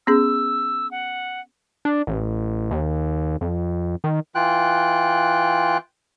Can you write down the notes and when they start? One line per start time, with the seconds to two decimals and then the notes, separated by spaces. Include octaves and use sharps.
0.07 B3 C#4 G#4 E6
0.91 F#5
1.85 D4
2.07 A1
2.71 D#2
3.41 F2
4.04 D#3
4.35 E3 F4 G5 F#6